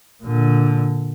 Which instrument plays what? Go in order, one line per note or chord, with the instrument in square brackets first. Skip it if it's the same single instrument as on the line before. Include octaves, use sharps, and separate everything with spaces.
[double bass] A#2 D3